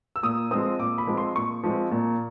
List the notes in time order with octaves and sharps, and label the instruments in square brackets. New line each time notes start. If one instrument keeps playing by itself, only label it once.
[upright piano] E6
A#2 D#6
F3 G#3 C4 D#6
A#2 D6
B5
F3 G#3 C4
C6
A#2 C#6
F3 G#3 C4
A#2